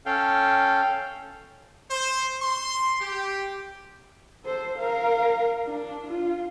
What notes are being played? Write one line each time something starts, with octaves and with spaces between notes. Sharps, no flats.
C#4 A4 F5 G5
C5
C6
G4
A4 C5
A#4 F5
D4
F4